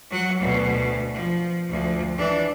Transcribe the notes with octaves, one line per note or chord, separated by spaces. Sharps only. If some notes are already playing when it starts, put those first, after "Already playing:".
F#3 F#5
D2 B2
F3
D2 F3
E3 D4